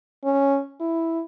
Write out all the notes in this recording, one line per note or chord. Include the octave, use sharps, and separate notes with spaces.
C#4
E4